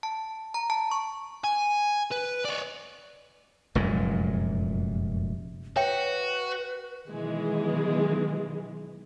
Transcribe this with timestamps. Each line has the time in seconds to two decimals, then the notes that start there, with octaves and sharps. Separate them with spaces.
0.03 A5
0.54 A#5
0.70 A5
0.91 C#6
1.44 G#5
2.12 B4
2.45 C#5 D5
3.75 F1 F#2 A#2 G#3
5.76 F#4 B4 C#5 E5 G5
7.09 B2 D#3 E3 F#3 G#3